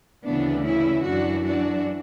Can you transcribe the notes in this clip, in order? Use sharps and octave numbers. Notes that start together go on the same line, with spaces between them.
D2 C#3 E3 B3 D4
C#4 E4
F#2 E3 D4 F#4
D4 F#4